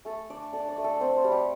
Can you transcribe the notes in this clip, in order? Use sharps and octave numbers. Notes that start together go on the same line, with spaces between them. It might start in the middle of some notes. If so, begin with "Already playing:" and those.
A3 A4
D4 D5
D4 A4
D5
A3
A4
C4 C5
C5
G3
G4